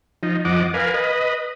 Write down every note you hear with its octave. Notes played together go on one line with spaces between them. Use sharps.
F3 D#4
F2 F3 D#5 F#5 D6
A#4 B4 F5 G#5
B4 D#5